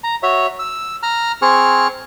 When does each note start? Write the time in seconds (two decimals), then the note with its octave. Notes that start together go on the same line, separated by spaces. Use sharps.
0.04 A#5
0.23 F#4 C#5 E5
0.59 E6
1.03 A#5 F6
1.42 C4 G#4 C#6 F6